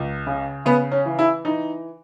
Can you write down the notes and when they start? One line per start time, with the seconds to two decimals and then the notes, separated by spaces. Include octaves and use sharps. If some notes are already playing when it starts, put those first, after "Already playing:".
Already playing: C#2
0.27 C#3
0.65 C#3 B3
0.92 C#4
1.05 E3
1.19 E4
1.45 E3 D#4